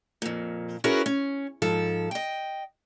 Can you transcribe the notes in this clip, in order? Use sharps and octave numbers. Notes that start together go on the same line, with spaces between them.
F2 A#2
C#4 E4 F#4 G#4 A#4 B4
C#4
G#2 F3 A4
D#5 G5